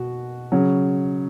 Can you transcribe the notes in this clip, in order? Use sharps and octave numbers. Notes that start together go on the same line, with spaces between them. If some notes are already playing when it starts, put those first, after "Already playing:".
Already playing: B2 F#4
C#3 F#3